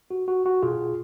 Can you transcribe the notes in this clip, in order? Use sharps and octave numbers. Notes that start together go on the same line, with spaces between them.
F#4
F#4
F#4
B2 F4 G#4